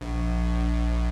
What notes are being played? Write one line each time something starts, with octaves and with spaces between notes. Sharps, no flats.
A#1